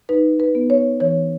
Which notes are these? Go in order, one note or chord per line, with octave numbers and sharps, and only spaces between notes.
D#4 B4
B4
B3
C#5
E3 C#5